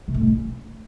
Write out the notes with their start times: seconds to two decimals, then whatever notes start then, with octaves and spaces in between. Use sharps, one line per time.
0.08 C3
0.14 A3
0.21 B2
0.27 A#3
0.34 C#4